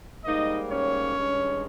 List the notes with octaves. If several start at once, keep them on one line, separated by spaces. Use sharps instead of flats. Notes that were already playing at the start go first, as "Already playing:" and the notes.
G#2 G3 A#3 D#4 D#5
C#4 C#5
G2 D#3 G#3